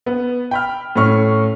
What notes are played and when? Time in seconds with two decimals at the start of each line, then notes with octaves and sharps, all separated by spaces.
0.06 B3
0.51 G5 B5 F6
0.96 A2 C#4 C#6 F6